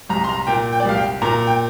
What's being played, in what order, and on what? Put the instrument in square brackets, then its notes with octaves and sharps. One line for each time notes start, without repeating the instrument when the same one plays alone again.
[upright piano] C2 A#5
C6
A#5
A#2 G5
G5
D5
C2 F5
G5
A#2 A#5
G5